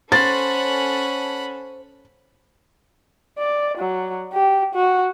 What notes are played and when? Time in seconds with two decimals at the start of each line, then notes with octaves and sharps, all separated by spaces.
0.12 C#4 A4 C5 F#5 B5 A6
3.38 D5
3.78 F#3
4.33 G4
4.75 F#4